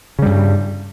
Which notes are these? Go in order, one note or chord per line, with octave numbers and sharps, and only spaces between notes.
G2 C#3 G3